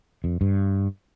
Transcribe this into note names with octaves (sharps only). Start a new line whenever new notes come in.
F2
G2